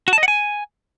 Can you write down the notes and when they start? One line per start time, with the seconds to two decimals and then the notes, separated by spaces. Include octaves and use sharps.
0.08 F#4
0.13 A5
0.18 D#5
0.23 F#5
0.28 G#5